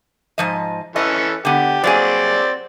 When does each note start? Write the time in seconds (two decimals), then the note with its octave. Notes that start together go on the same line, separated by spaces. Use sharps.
0.38 G#2 F3 D#5
0.96 E3 C#4 A4 D#5
1.45 D3 B3 G4
1.84 F#3 A#3 C4 G#4 D5